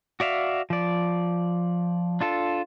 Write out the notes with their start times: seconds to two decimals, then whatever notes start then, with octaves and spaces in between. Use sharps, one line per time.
0.20 F#4 D5 E5 F5
0.70 F3 D5
2.21 D4 F4 A4